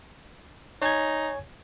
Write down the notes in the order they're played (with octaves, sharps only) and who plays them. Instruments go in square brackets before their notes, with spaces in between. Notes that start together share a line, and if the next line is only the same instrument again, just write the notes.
[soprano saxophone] D#4 [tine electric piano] C#5 G#5 G#6